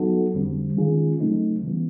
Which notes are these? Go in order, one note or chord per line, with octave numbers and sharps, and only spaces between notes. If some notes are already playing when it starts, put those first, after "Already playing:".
Already playing: F#3 B3 D#4 F#4 A4
F2 D3 G3 C4
D#3 G#3 C#4 F4 G#4
C#3 F#3 A3 C4 D#4
C#3 E3 G3 B3